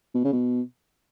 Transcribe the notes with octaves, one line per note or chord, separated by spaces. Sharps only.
B2
C#3
B2